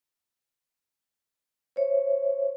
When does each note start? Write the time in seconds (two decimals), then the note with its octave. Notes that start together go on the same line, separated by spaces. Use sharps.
1.76 C5 C#5 E5